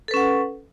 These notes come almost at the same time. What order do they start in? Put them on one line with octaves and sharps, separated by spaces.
A4 B4 C#4 F#5